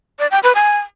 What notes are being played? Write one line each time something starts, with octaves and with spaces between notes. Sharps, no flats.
D5
G5
B4
G#5